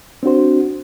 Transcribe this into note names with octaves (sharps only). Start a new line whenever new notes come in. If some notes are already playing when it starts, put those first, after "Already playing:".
C4 D4 F#4 C5